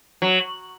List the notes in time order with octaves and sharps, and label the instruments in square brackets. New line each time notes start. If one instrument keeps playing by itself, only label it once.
[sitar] F#3